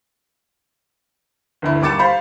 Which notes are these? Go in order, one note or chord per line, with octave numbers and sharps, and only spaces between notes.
G1 D2 E4
D#2 G3 D6 A6 C#7 E7
C5 F5 B5 C6